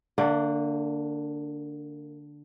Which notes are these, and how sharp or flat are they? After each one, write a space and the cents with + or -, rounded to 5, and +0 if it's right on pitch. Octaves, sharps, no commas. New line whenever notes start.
D3 +0 A#3 -35 D5 +0